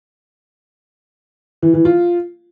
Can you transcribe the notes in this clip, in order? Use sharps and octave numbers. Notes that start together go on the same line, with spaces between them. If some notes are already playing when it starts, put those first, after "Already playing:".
E3
E3
F4